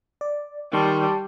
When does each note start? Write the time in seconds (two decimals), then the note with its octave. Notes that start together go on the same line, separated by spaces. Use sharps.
0.21 D5
0.73 D#3 G3 A5 C6 C#6